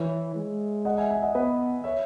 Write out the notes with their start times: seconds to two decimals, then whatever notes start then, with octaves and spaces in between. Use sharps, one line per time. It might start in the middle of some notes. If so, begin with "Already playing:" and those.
Already playing: E3 C#5 E5
0.36 G#3
0.85 D#5 F#5
0.98 E5 G#5
1.10 E5 G#5
1.22 D#5 F#5
1.35 B3 B4 D#5
1.84 C#5 E5